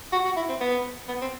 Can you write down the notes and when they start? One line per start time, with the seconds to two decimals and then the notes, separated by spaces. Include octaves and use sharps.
0.12 F#4
0.25 F#4
0.36 E4
0.49 C4
0.61 B3
1.09 B3
1.21 C4